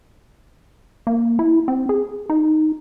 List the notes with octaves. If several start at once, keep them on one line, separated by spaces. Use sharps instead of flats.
A#3
E4
C4
G#4
D#4